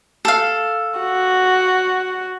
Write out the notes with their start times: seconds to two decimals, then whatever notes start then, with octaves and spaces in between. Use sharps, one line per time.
0.25 A4 F5
0.99 F#4